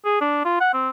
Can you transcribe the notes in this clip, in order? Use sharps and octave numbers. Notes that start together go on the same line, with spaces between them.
G#4
D4
F4
F#5
C4